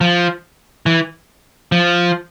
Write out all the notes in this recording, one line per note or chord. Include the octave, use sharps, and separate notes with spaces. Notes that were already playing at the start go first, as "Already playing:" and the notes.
F3
E3
F3